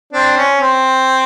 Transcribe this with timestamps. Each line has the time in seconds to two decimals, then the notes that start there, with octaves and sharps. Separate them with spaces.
0.13 C4 D4
0.37 C#4
0.61 C4